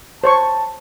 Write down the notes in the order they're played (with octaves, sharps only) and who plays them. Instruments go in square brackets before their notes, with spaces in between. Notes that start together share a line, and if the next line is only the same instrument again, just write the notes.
[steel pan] C5 C#5 C#6 [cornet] A5